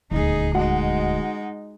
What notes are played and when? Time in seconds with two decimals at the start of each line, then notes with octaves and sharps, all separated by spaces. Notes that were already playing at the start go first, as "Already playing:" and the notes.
0.11 D#1 D2 D#4 G#4
0.54 G#3 D#4 F#4 F#5